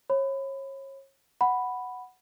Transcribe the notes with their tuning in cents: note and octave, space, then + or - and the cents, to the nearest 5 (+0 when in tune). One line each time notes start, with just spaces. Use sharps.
C#5 -30 B5 +25
F#5 +0 B5 +0